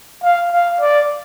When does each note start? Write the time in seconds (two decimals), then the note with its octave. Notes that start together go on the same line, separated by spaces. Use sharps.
0.23 F5
0.52 F5
0.81 D5